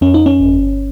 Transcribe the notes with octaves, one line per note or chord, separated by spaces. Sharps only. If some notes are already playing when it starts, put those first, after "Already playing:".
F2 C#4
D#4
C#4
G1